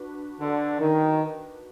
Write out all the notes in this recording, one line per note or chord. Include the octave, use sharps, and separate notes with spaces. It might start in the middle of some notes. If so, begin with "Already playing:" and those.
Already playing: D4 F#4 B4
D3
D#3